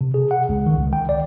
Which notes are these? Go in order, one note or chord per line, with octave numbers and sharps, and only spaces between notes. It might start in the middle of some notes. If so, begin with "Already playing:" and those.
C3
G#4
F#5
C#2
D#3
C#2
G5
D5